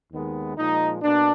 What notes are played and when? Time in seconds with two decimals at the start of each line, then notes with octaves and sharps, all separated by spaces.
0.10 D#2 D#3 G#3 B3
0.56 A#2 F3 G#3 D#4
1.01 B2 A#3 D4